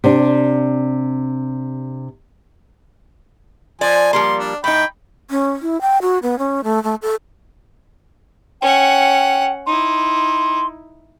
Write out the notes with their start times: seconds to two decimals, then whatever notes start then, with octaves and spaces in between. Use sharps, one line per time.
0.04 C3 D4
3.81 F3 D5 G#5
4.13 F3 G3 A#3 C6
4.39 D4
4.64 A2 D#4 G5 B5
5.30 C#4
5.62 E4
5.81 G5
6.02 F#4
6.23 B3
6.39 C#4
6.64 A3
6.83 A3
7.02 A4
8.61 C#4 F#5 G5
9.66 D#4 E4 C6